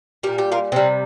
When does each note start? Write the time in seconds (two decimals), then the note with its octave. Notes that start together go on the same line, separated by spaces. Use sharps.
0.23 A#2 G3 A#4
0.38 G4
0.52 F4 A#4
0.72 C3 G3 C4